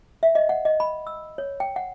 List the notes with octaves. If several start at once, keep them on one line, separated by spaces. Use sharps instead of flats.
E5
D#5
F#5
D#5
B5
E6
C#5
G5
F#5